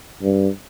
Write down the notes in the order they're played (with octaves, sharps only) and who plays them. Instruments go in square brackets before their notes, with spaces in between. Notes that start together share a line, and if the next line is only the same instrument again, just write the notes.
[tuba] G2